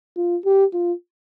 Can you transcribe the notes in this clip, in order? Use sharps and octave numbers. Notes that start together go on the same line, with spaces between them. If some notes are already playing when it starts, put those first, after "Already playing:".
F4
G4
F4